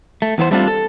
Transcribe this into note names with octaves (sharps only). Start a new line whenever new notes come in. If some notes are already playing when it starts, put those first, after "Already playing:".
A3
E2 E3 B3 C5
G3 A3 C4 D4 D#4 F4
A4